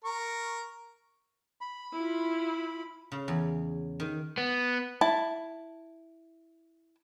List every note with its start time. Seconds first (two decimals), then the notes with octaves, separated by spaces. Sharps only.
0.04 A#4 C#6
1.61 B5
1.93 E4 F4
3.12 C#3
3.28 E2
4.00 D#3
4.38 B3
5.01 E4 A5